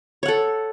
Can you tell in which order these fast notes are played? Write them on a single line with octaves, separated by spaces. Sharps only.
C#5 F#5 A4